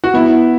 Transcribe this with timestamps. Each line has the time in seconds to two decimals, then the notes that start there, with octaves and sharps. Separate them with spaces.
0.04 F#4
0.14 B3 E4